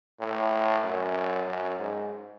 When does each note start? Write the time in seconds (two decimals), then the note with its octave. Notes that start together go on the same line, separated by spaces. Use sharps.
0.20 A2
0.84 F#2
1.47 F#2
1.79 G#2